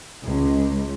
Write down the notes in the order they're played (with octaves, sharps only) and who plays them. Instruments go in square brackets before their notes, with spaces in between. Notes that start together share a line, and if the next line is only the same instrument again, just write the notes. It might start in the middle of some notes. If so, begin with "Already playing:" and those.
[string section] C#2